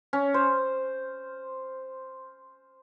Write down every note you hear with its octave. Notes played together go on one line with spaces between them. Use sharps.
C#4
C5